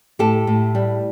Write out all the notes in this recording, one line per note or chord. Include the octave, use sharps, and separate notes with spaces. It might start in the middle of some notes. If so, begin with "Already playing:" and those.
A2 G4 A4
A2
G3